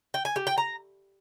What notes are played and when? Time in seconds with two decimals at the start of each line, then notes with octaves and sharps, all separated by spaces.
0.14 G5
0.25 G#5
0.36 G4
0.47 G5
0.58 A#5